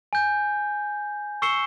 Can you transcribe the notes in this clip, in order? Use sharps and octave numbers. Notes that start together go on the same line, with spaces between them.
G#5 G6
C#6 E6 C7 C#7 E7 G7